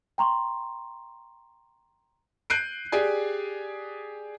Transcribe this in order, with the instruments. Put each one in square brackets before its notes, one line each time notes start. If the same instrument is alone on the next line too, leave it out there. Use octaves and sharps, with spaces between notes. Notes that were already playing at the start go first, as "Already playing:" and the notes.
[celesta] G5 A#5 C6 C#6
[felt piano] F#6 G6 C7 D7 D#7
G4 G#4 D5 G#5